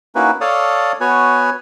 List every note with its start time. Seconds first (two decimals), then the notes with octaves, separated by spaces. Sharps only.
0.15 A#3 C#4 D#4 E4 F#4 B4
0.41 A4 C#5 D5 F5 A5 D#6
1.01 B3 F#4 B4 C#5 G#5